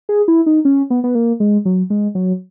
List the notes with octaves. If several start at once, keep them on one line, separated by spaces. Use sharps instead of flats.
G#4
E4
D#4
C#4
B3
B3
A#3
G#3
F#3
G#3
F#3